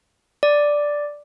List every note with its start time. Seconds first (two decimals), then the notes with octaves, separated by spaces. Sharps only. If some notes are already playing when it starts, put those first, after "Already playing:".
0.43 D5